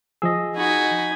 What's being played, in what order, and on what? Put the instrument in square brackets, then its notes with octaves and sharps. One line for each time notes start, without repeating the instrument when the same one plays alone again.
[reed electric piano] F3 E6 [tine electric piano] G#4 D#5
[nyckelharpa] D#4 G#5 [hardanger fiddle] F#4 B5